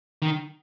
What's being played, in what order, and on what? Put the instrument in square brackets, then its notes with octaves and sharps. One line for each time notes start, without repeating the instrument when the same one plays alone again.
[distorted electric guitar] D#3